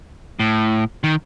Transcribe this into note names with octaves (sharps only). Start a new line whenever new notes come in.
A2
D#3